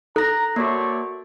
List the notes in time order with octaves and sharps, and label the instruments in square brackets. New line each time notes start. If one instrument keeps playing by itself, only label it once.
[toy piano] A4 [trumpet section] A#5 [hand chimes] F#6 A#6
[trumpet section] A3 C#5 D5 [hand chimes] A#3 F#4